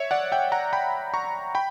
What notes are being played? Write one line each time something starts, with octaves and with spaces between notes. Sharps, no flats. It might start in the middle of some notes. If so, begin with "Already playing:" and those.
Already playing: C#5 E5
D5 F#5
E5 G5
F#5 A#5
G5 B5
A#5 C#6
G5 B5